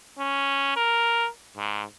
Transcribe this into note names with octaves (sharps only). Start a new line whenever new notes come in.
C#4
A#4
G#2